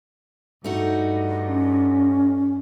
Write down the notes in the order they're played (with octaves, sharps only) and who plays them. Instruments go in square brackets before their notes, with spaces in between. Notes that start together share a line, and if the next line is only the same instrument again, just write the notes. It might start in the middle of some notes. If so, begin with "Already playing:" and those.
[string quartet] G2 [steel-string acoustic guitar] A3 D#4 F#4
[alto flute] C#4